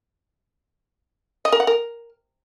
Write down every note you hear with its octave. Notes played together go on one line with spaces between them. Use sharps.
D#5
A#4
F#5
A#4